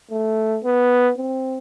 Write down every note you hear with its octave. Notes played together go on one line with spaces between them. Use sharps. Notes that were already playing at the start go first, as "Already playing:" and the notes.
A3
B3
C4